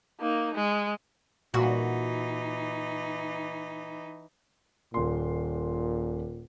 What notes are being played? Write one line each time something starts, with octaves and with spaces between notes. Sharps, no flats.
A#3 D#4
G#3
A#2 E3 D#4 F#4
D#1 A#2 C6